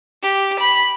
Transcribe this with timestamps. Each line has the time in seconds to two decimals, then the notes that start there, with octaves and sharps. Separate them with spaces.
0.23 G4
0.60 B5